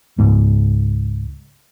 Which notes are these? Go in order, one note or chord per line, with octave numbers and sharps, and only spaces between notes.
C#2 G#2